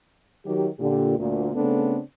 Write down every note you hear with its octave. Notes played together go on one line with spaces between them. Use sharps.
D#3 F#3 G4
A#2 D3 G4
D2 A#2
C#3 A3 B3 C4 D4 A4